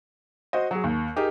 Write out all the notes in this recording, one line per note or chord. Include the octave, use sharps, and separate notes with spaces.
F#4 C5 D#5
F#3 G#4
D#2
D#4 G4 G#4 A#4